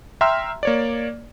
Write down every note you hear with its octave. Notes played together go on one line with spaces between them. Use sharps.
E5 G5 A#5 C6 E6 F6
A#3 C#5 D5